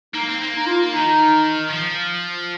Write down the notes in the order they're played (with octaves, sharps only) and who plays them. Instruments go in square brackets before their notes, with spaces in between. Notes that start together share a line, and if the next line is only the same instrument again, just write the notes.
[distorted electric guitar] A#3 [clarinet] D#4
[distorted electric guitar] C4
A#3
[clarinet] D#4
F4
[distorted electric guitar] D#3 [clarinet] D#4
[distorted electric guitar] F3